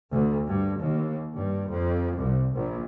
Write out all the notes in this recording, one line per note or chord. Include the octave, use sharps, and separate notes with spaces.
D2
G2
D#2
G2
F2
C2
A#1